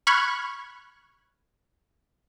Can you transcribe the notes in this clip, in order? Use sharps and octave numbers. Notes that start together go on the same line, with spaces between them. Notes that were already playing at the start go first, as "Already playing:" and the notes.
B5 C#6 F6 F#6 G#6